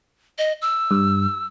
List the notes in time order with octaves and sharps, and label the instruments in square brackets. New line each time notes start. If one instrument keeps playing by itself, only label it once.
[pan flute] D#5
E6
[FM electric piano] G2